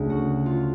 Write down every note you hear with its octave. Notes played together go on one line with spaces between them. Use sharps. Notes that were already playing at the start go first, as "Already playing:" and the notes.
Already playing: D2 C#3 A3
F#4
F4